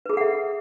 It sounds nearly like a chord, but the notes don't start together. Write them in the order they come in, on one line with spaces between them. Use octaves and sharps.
B4 G#4 A4 F#5 E5